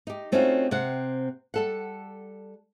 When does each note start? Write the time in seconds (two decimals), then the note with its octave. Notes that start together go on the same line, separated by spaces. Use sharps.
0.07 D#4 G4
0.32 A3 C4 C#4 D#4 F4 F#4
0.71 C3 C4 F#5
1.54 G3 A4 F#5